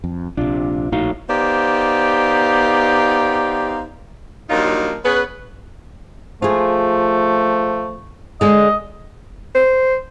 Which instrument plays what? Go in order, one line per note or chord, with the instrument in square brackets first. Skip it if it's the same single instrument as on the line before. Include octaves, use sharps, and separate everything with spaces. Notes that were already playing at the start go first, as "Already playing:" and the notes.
[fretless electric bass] F2
[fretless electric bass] A#1 C3 [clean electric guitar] D4 F4
[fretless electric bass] A#1 A2 [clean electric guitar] D#4 F#4 F5
[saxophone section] B3 D#4 G4 C5 D5 F5
G2 A#2 F3 F#3 D#4 F4
B3 C#4 G#4 B4
[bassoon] F3 [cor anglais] A3 [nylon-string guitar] F4 G#4
[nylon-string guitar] D3 G#3 [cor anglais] D#5
[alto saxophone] C5